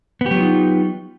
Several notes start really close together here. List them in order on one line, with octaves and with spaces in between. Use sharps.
B3 G4 F#3 F4 D#4